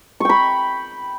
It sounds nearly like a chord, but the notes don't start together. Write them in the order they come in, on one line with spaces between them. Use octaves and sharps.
C#6 G5 B5